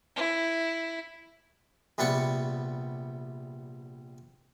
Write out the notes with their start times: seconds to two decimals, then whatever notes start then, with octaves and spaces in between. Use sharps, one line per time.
0.16 E4
1.98 A#1 C3 G3 B3 F#5 C#6